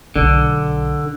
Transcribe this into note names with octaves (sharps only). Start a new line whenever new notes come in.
B1 D3